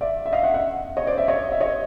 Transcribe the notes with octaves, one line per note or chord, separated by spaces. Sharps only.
D5 E5
E5
D#5 F5
E5 F#5
E5 F#5
C#5 D#5
C5 D5
D5 E5
C#5 D#5
E5
C#5 D#5